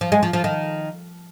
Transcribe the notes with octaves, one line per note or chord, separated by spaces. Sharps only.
F3
G#3
F3
F3
D#3